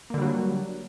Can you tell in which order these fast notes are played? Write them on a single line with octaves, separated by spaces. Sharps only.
A#3 D3 G3 F#3